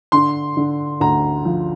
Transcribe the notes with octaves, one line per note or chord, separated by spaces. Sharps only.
D3 C6
D3
D2 A#5
F3